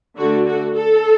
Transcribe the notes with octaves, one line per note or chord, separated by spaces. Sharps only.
D3 A3 D4 F#4
F#4
A4